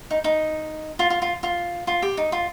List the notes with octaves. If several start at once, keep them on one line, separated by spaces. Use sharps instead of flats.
D#4
D#4
F4
F4
F4
F4
F4
G4
D#4
F4